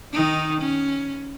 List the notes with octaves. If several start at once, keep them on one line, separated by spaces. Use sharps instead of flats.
D#3 D#4
C#4